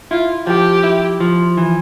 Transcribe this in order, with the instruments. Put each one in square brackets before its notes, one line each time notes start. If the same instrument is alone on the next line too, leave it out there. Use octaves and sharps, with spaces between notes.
[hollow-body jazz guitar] E4 [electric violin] F4
[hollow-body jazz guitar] F3 [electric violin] G4
[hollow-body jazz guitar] E4
F3
E3